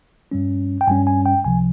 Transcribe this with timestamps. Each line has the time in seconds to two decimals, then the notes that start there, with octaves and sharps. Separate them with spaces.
0.31 G2 G3 C#4
0.81 G5
0.88 G2 G3 C#4 G#5
1.07 G#5
1.26 G5
1.44 C#2 C3 F3 G#5